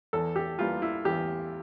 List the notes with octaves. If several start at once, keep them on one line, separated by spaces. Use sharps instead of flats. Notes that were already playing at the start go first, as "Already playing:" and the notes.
E2 A4
G4
E3 G3 A#3 F4
E4
E2 G4